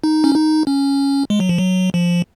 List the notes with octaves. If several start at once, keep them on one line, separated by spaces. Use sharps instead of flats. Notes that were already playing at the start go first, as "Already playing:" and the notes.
D#4
C#4
D#4
C#4
G#3
F#3
F3
F#3
F3